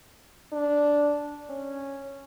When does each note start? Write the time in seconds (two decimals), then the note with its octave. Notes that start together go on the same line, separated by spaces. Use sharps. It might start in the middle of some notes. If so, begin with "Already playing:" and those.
0.53 D4
1.50 C#4